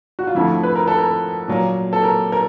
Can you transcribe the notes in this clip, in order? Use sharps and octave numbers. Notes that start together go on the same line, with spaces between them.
F#4
F4
F2 D3 F3 A3 E4
B4
A#4
A4
A#4
A#2 F#3 A#3
A4
A#4
A#4